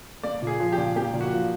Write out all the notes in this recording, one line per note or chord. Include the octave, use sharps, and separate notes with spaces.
A#3 D5
A#2 G#4
F3
G4
A#2
A#3 G4
A#2
F#4
F3